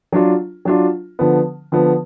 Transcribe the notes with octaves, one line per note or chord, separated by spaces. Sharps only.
F#3 D4 F4
F#3 D4 F4
D3 F3 B3
D3 F3 B3